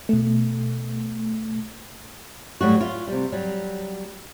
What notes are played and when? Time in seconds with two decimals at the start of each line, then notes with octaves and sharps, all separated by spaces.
0.09 B2 A3
2.61 A2 F#3 G3 F#4
2.81 F4
3.07 C3 G3
3.32 F#3 G3